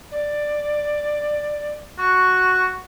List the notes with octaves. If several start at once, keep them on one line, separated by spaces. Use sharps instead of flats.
D5
F#4 C#6